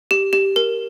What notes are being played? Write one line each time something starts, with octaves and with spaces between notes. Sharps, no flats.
G4
G4
A#4